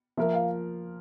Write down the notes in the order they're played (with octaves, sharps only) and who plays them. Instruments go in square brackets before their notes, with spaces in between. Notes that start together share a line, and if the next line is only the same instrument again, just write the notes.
[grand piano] F3 A#3 F4 A#4 [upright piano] E5
[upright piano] F5